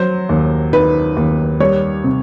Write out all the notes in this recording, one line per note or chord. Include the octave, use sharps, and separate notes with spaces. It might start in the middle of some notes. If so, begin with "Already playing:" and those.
Already playing: F#3 C5
D#2
D#3 B4
D#2
G3 C#5
C3